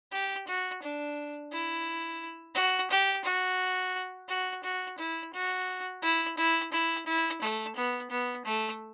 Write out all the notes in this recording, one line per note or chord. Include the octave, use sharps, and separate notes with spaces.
G4
F#4
D4
E4
F#4
G4
F#4
F#4
F#4
E4
F#4
E4
E4
E4
E4
A3
B3
B3
A3